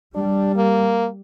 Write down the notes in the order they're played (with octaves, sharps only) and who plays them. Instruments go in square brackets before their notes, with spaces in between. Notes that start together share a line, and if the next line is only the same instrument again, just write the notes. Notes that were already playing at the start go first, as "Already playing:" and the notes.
[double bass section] G3 [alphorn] D4
[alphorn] A#3